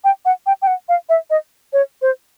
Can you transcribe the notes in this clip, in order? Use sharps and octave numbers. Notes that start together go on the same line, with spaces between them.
G5
F#5
G5
G5
F#5
F5
E5
D#5
C#5
C5